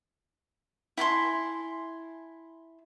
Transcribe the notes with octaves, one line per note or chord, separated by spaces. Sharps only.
E4 G#5 A5 C6